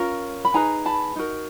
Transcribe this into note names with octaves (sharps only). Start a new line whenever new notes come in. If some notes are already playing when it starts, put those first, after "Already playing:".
Already playing: C#4 F4 A#4
B5
D#4 G#4 B4 G#5 A#5
A5 B5
D#4 F#4 A#4